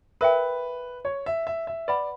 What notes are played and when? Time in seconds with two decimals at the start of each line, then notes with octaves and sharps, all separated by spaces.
0.21 A#4 B4 E5 G5
1.05 C#5
1.26 E5
1.47 E5
1.67 E5
1.88 B4 D5 F#5 B5